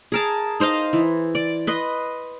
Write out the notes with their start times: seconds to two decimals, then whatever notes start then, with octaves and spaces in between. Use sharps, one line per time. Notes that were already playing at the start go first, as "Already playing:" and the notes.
0.12 G#4 A#4 A5
0.60 D#4 C5 D#5 F5
0.93 E3
1.35 D5
1.67 B4 D#5 C6